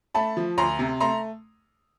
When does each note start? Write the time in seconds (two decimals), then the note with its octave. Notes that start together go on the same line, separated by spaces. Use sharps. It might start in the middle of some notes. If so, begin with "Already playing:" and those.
0.14 A3 A5 B5
0.37 F3
0.58 D2 A#5 C6
0.79 C3
1.00 A3 A#5 C6